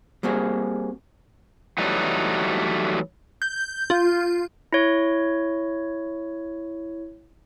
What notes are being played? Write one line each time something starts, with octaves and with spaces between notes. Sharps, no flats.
G3 A#3 C4 F#4 G#4
E3 F#3 G3 A3 D#4
G6
F4
E4 C#5